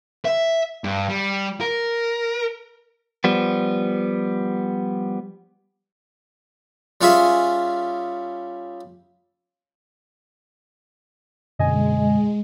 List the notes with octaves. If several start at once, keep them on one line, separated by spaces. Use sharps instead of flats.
E5
G2
G3
A#4
F3 G3 B3
G3 C#4 F4 G#4 E5
F#2 B2 D3 G#3 D#5 G#5